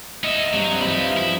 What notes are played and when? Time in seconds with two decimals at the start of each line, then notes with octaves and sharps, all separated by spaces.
0.24 B3 D#4 E5
0.53 G2 F#3 C4
0.81 G2 E3 F4 B5
0.99 F5
1.17 F3 E4